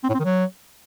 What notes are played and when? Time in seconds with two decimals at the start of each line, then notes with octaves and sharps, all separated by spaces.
0.04 C4
0.09 A2
0.14 C4
0.19 D#3
0.25 F#3